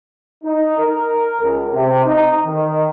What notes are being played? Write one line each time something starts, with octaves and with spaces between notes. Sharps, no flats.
D#4
A#4
C#2
C3
D#4
D#3